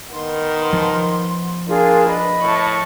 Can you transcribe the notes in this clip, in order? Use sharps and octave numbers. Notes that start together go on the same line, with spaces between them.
D#3 B3 C6
F3
A#3 D4 F4 G#4
B4 D#5 B5
A2 A5 C#6